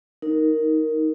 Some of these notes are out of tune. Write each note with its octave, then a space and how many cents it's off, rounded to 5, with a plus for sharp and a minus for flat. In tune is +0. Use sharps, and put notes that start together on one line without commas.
D#4 +10 A#4 +0